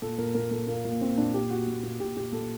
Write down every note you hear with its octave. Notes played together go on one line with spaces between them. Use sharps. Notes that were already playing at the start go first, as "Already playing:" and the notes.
A#2 A4
A#2 A#4
A#2 A#4
A#2 A4
A#2 A#3
A#2 A#3
A#2 C4
A#2 D4
A#2 G4
A#2 F#4
A#2
A#2
A#2 G4
A#2 G4
A#2 A4